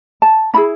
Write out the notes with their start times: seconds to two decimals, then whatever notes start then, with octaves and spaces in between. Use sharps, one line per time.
0.22 A5
0.54 C#4 E4 G#4 B5